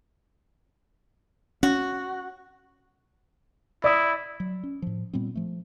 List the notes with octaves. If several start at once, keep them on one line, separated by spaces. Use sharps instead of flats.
C#4 F#4
E4 D5 D#6
F#3
C#4
A2 F3
A#2 G3 B3 C4
F3 A3